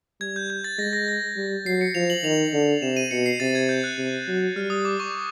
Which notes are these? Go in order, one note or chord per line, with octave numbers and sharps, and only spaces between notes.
G3 G#6
G6
G6
A6
G#3 A#6
A#6
A#6
G3
F#3 C7
C#7
F3 F7
F#7
D#3 F7
D3
C3 E7
D#7
B2 C#7
C7
C3 A6
G#6
G6
F#6
C3
F#3
G3 F6
D#6
D6
C#6